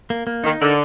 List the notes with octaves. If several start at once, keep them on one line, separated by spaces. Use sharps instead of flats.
A#3
A#3
D#3 D#4
D3 A#4